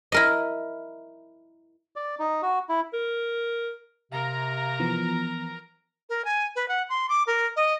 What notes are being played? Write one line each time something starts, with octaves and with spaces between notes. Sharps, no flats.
E4 A#4 D#5
D5
D#4
F#4
E4
A#4
C3 A#4 F5 A#5
E3 F3 B3
A#4
G#5
B4
F#5
C6
D6
A#4
D#5